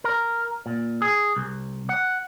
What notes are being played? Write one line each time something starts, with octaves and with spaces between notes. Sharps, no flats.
A#4
A#2
G#4
C2
F#5